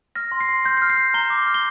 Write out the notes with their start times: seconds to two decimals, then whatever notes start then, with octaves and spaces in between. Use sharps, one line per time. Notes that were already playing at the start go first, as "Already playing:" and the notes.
0.16 F6 A#6
0.32 C6
0.41 C7
0.49 C6
0.65 C6 G6
0.77 C7
0.82 F6
0.90 C7
0.97 F6
1.14 A#5 G7
1.30 D6
1.46 F6
1.54 G7